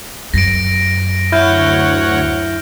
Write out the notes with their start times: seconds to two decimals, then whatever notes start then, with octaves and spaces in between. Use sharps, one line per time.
0.34 F#2 A#6 D7
1.32 D2 E4 C#5 F#5 F6 G6